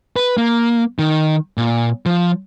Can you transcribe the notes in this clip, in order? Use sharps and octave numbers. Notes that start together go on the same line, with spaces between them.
B4
A#3
D#3
A#2
F3